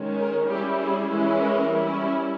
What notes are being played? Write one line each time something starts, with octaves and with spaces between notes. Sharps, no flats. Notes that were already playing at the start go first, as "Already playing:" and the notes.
Already playing: D#3 G#3 C#4
A#4
G3 C#4 E4 G4
G#4
E3 G#3 C#4 E4
A#4
G3 C#4 E4